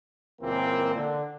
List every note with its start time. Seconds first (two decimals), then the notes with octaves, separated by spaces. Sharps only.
0.41 C#2 A#2 E3 A#3 C4
0.94 D3